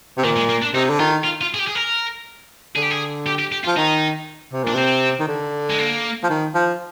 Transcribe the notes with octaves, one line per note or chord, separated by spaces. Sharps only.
C3
A#2 D#3
G#3
A#3
D4
C3 D#4
D3
D#3 F4
F4
F4
G#4
G4
G#4
A#4
D3 G#4
G4
G#4
G4
G4
G4
F4
F3
D#3 D#4
C3
A#2 D4
C3 C4
D#3
D3
G#3
A#3
F3
D#3
F3